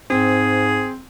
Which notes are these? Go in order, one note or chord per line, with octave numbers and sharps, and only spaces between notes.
G#2 C4 G#4